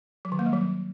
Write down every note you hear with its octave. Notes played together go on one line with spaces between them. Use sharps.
F#3
D#3
A#3
G3
F#3